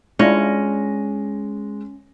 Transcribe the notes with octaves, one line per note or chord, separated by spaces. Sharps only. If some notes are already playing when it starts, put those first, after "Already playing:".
G#3 C#4 D4 E4 F4 A#6